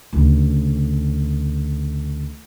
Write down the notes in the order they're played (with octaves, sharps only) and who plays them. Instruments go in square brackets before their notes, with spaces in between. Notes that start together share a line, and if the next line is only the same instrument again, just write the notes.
[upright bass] D2 C#3